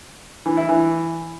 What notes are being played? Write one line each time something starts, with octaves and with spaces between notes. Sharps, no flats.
E3
E4
E3